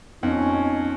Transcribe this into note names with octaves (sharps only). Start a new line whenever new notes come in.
F2 B3 C#4 D#4